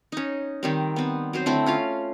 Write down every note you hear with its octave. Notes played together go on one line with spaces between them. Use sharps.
C#4 D#4
D#3 G3 C4
B3 C4
F#3 C4 C5
D3 A3 C4 E4
C#4 F4 F5